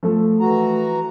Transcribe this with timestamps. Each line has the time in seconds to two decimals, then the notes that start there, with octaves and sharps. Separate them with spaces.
0.03 F3 A3 A4
0.40 E3 F#4 A#5